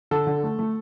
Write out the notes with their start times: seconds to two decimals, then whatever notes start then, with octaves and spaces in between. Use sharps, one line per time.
0.11 D3 A4
0.27 D3
0.43 A3
0.59 A3